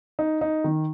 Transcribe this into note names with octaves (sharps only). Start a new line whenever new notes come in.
D#4
D#4
D#3